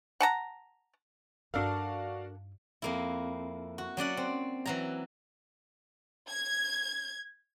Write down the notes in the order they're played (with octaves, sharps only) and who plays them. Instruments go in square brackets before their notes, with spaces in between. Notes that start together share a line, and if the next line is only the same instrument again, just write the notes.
[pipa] F#5 A5 A#5
[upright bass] G2 D#4 [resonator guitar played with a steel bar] D4 A4 A#4 [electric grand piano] F#4 D5 F5
[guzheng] F2 A#3 E4
F#4
F#3 C#4 D5 F#5
C4
E3 F#3 A#5
[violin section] G#6